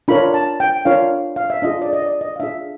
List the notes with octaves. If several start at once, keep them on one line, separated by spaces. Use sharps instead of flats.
D4 F4 A#4 C#5 B5
A5
G5
D4 F4 A#4 C#5 F5
F5
E5
D4 F4 G#4 D#5
D5
D#5
D5
D#5
F5
D4 F4 G#4 E5